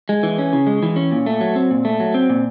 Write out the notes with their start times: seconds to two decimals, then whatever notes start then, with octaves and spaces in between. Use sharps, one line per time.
0.09 G#3
0.23 E3
0.38 C#4
0.53 C#3
0.67 G#3
0.83 E3
0.96 C#4
1.11 A#2
1.26 A3
1.41 F#3
1.56 C4
1.71 A#2
1.85 A3
2.00 F#3
2.14 C4
2.29 A#2